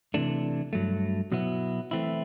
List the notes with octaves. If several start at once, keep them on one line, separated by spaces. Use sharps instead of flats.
C3 E3 A3 D4
G2 F#3 A3
B2 F#3 B3 E4
E3 A3 C4 E4